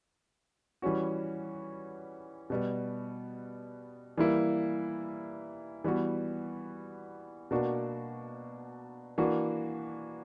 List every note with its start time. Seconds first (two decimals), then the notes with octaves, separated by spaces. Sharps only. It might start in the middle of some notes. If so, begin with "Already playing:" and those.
0.82 E3 G3 C#4 F#4
2.50 B2 G3 B3
4.17 E3 G3 A#3 E4
5.84 E3 G3 B3 F#4
7.51 B2 A#3 D4 F#4
9.18 E3 A#3 D4 F#4